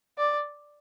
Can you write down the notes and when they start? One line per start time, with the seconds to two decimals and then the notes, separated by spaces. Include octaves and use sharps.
0.18 D5